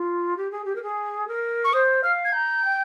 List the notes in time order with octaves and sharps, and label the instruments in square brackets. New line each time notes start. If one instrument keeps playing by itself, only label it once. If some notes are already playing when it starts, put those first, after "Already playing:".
Already playing: [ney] F4
G4
G#4
G4
A#4
G#4
A#4
[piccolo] C#6
[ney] C5 [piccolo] D#6
[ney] F5 [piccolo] F6
[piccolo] G#6
[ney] A#5 [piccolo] G6
[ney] G5